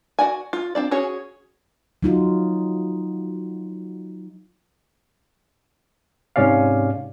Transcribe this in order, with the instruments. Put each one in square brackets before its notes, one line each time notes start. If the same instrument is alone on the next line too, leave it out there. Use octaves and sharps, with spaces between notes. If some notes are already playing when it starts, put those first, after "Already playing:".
[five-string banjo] F#4 D5 G#5
F4
C4 D4 D5
C#4 F#4 G#4 C#5
[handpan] F#3 D#4 F4 F#4
[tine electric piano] G#2 C3 C#4 D5 F5